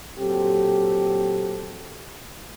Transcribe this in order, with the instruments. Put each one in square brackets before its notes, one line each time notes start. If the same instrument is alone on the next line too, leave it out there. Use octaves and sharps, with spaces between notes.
[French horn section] A#2 F#3 C4 G4 A4